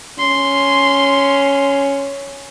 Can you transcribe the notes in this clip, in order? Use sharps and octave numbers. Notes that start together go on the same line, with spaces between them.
C#4 C6